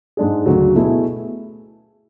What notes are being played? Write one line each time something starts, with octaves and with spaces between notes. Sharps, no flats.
G#2 G#3 D4 G#4
D2 C#3 F#3
B2 A3 E4 G#4